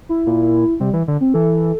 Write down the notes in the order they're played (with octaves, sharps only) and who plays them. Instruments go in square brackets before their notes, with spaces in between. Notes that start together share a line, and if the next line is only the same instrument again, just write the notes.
[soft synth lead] E4
[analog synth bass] A#2
[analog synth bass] C3 [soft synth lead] G3
[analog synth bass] E3
D3
[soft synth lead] C4
[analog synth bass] E3 [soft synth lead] A4